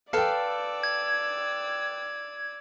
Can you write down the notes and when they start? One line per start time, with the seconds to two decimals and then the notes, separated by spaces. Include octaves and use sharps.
0.13 A4 B4 D5 F5 G5 E6
0.83 G#6